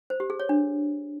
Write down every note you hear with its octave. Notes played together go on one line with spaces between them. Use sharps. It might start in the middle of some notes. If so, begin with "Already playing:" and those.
C5
G4
G#4
C#5
D4